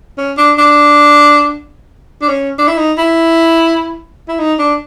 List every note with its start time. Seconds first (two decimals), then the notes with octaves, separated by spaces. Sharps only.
0.18 C#4
0.37 D4
0.58 D4
2.22 D4
2.28 C#4
2.58 D4
2.68 E4
2.78 D#4
2.98 E4
4.28 E4
4.39 D#4
4.59 D4